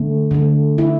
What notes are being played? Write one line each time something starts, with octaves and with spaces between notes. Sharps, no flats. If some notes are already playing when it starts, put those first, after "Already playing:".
Already playing: D3 A3
D3 A3
E4